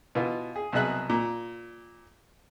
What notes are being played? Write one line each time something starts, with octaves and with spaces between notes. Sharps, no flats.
B2 E3 F4
G#4
C2 B2 F#3 G#4 E5 F#6
A#2